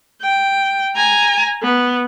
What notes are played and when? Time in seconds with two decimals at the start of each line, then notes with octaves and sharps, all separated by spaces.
0.21 G5
0.96 G#5 A#5
1.62 B3